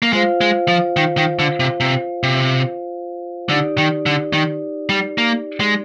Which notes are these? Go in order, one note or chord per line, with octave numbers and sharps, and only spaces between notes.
A#3
G#3 F4 C5 F5
G#3
F3
D#3
D#3
D3
C3
C3
C3
D3 D#4 G4 D5
D#3
D3
D#3
G3
A#3
G#3